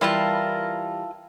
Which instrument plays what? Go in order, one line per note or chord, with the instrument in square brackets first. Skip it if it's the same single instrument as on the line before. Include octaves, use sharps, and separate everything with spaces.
[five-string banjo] E3 G3 [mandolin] E4 F4 A5 [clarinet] A#4